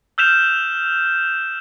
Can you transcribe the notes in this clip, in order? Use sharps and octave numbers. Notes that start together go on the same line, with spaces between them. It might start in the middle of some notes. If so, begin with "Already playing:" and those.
E6 F6 G6 B6 E7 F7